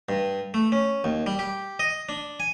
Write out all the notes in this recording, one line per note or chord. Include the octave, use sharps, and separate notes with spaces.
G2
A3
C#4
D#2
G3
G4
D#5
D4
G#5